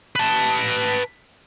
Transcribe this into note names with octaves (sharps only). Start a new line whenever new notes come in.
B4 A5